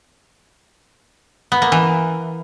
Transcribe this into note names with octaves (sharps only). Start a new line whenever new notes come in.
B3
A#3
E3